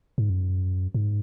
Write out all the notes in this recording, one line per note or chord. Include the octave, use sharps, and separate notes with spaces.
G#2
F#2
G#2